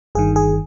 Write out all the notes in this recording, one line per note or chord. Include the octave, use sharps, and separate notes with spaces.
G1 G2 D#3 G#4
G#4